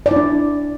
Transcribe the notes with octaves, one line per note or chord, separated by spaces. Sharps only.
D5
E4
D4